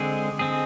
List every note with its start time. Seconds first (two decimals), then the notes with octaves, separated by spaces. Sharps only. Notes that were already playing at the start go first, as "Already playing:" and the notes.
Already playing: D3 G#3 C4 G#4
0.39 D3 G#3 C4 G#4